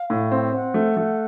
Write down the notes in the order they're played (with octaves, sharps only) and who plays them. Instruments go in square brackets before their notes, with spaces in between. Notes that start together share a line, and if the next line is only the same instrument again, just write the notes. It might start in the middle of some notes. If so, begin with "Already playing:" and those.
Already playing: [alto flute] F5
[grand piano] A2
C4
[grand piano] C4 [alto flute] F#5
[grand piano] A3
A3